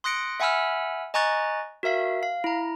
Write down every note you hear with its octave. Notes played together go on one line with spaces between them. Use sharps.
C6 D#6 F#6 A#6 C#7 D7
E5 F#5 G#5 B5 E6 F6
D#5 G#5 A#5 C#6 F#6 A6
F#4 A#4 E5 F5
F5
E4 A#5